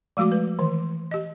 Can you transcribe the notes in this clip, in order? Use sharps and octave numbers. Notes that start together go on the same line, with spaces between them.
F3 G#3 A3 F#4 D6
B4
D#3 E3
G4 D#5